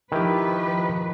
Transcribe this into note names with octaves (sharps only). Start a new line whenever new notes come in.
D#3 F3 E4 G4 B4